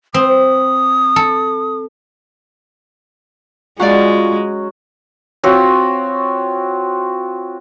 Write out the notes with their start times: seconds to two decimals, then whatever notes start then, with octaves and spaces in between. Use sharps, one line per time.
0.14 C4 D#6
1.16 A4
3.80 F#3 G#3 C#4 F4 F#4 D5 F5 F#5
5.44 C4 F4 F#4 C#5